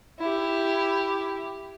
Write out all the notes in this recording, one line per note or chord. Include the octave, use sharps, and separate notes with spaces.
E4 G4